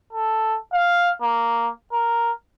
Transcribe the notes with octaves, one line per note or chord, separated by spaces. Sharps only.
A4
F5
A#3
A#4